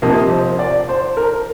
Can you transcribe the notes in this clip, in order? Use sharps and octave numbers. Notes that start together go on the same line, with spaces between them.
C3 F3 A#3 D#5
C5
D5
C5
A#4